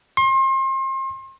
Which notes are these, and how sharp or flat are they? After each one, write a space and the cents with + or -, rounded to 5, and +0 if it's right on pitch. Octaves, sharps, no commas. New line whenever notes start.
C6 +35